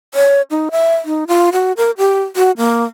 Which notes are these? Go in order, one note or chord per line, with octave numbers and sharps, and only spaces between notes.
C#5
D#4
E5
D#4
F4
F#4
A#4
G4
F#4
A#3